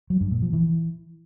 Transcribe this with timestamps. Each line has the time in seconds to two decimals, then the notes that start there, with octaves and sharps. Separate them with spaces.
0.10 F#3
0.21 G2
0.32 A#2
0.42 F3
0.53 E3